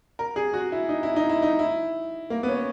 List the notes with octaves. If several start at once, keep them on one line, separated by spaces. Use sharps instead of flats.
A#4
G#4
F#4
E4
D#4
E4
D#4
E4
D#4
E4
A#3
B3
C#4